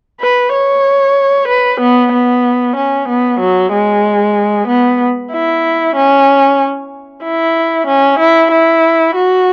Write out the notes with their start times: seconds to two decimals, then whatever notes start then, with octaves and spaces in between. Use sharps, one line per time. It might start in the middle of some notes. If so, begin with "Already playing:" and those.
0.21 B4
0.53 C#5
1.48 B4
1.81 B3
2.12 B3
2.76 C#4
3.09 B3
3.40 F#3
3.72 G#3
4.68 B3
5.32 E4
5.96 C#4
7.23 E4
7.87 C#4
8.20 E4
8.51 E4
9.15 F#4